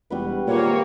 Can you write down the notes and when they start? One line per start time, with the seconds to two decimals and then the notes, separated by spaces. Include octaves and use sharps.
0.10 E1 G3 F#4 B4
0.47 G#1 A#2 A#3 C#5 G5 A#5